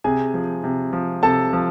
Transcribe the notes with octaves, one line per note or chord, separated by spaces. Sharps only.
C3 G#4 G#5
F3
C3
F3
C3 A4 A5
F3